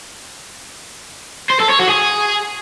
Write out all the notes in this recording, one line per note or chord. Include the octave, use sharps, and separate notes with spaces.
C5
A4
C#5
F#4
G#4